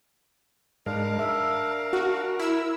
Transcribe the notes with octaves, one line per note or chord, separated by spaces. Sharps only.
G#2 G#3 D4 A#4 F5
A#4 E5
F#4
E4 E6